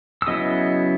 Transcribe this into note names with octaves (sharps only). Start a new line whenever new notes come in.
E6
C#3 F#3 B3 E4 D#5 D#6